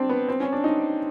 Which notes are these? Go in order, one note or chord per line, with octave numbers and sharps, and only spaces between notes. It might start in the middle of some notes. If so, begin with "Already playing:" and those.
Already playing: C4 D4
B3
C4
C#4
D4
D#4